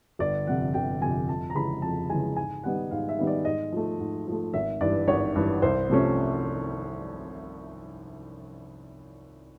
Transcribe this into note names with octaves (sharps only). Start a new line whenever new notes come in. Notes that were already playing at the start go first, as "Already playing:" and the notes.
G1 D5
F2 C3 F#5
G1 G5
F2 C3 G#5
F2 A5
A#5
C#3 E3 G#3 B5
F2 A5
C#3 E3 G#3 G#5
G#2 G#5
D#3 G3 B3 D#4 F#5
G#2 F5
E5
D#3 G3 B3 D#4
D5
G#2 D#5
F3 A3
G#2
F3 A3
G#1 E5
G2 E3 D5
G#1 C#5
G2 E3
C2 C5
C3 F3 A3 C#4